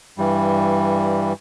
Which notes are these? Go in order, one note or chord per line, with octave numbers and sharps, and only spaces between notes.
G2 E3 G3